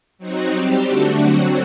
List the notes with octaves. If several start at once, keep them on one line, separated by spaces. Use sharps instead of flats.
F#3 C4 D#4 F#4
G3 C4 G4
D3 A3 D4 F#4
D3 F#3 C4 F#4